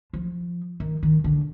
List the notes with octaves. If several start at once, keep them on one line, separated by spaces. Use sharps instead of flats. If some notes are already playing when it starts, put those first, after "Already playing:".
F3
D#3
D#3
D3